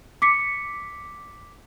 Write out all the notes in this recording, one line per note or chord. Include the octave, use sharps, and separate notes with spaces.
D6 B6 C#7